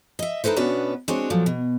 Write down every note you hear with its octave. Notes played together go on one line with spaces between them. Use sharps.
D#5 E5
D#4 E4 A4 B4 C5
B2 B3 C#4 D4 F#4 B4
G#3 C4 D4 F#4 C#5
A#2 F3 F#3 A3
B2